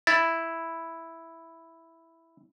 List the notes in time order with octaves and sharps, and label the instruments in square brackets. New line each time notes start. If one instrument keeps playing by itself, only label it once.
[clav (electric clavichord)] E4 [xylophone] A6